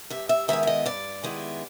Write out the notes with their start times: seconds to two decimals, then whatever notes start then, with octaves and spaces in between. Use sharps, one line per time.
0.10 G2 E5
0.29 E5
0.48 D#3 G#3 B3 E4 E5
0.63 E5
0.67 D#5
0.86 G2 D5
1.23 D#3 G#3 B3 E4